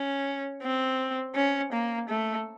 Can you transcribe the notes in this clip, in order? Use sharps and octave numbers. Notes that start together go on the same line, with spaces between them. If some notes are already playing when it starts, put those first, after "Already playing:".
Already playing: C#4
C4
C#4
A#3
A3